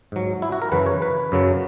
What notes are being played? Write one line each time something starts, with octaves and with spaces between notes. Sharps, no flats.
G#2 F#3
E4
F#4
A#4
F#2 C#3 E3 B4
C#5
B4
F#2 C#3 F#3